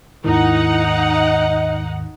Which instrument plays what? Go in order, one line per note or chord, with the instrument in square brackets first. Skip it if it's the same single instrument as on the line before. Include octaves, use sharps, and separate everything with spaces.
[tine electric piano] D#2 G#2 D#3 [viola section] D#4 F#5 [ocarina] E4
[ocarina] D#5